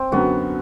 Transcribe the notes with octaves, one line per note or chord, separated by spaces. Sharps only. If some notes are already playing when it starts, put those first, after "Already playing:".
Already playing: C4
F#2 D3 F#3 B3 F#4